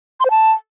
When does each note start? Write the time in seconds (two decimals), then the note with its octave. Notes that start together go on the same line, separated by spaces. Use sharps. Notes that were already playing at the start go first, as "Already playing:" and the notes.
0.20 C6
0.25 C5
0.31 A5